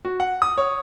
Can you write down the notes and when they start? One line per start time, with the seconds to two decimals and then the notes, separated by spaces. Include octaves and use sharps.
0.05 F#4
0.20 F#5
0.42 D#6
0.58 C#5